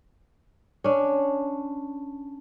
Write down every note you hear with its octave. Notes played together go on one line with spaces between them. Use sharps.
C#4 D4